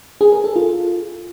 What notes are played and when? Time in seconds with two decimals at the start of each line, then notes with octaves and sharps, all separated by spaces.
0.21 G#4
0.32 A#4
0.44 A4
0.56 F4